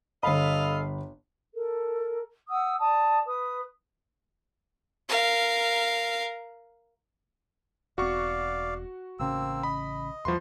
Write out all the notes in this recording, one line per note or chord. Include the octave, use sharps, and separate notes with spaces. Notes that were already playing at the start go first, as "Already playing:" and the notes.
G1 A4 D#5 F5 B5
A4 A#4
F#5 D#6 E6
D5 A5 D#6
B4 D#6
A#4 F5
E1 C4 F#4 D5 F5 C#6
A1 C#3 A#3 C4 C#4 E6
D#5 B5
E2 F3 G3 A3 F#4 B4 C6